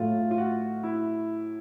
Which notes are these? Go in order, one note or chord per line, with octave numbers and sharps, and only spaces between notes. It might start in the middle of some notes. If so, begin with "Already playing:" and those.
Already playing: A2 F#3 A3 F4
F4
F#4
E4